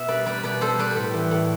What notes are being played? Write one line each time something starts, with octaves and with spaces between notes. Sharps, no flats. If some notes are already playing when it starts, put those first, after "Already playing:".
Already playing: B2 E5
G3 B4 D5
G3 B4 D5
B2 B4 D5
G3 A4 C5
G3 B4 D5
A2
E3
A2